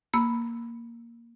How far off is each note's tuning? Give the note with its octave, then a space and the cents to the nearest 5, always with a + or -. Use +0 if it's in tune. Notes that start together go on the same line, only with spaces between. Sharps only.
A#3 +0 B5 +0 E6 +0